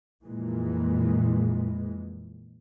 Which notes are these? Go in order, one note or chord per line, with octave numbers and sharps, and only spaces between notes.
F2 A#2 E3 G#3